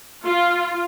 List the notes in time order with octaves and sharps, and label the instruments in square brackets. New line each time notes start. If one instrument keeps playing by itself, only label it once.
[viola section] F4